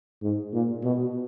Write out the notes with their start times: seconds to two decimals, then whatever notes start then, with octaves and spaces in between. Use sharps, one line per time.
0.22 G#2
0.53 A#2
0.83 B2